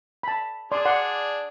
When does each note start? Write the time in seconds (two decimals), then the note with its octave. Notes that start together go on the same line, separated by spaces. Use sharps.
0.23 A5 B5
0.72 D4 G#4 D5 C6
0.85 D5 F#5 C6